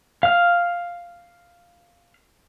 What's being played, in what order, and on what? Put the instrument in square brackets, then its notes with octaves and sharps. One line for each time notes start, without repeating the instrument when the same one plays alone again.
[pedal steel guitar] F5 F6